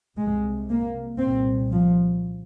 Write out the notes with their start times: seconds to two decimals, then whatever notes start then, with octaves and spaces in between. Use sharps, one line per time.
0.18 C2 C3 G#3
0.69 A#3
1.20 C2 A#2 C4
1.71 F3